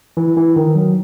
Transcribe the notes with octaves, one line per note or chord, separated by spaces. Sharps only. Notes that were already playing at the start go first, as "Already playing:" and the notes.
E3
E3
D#3
F#3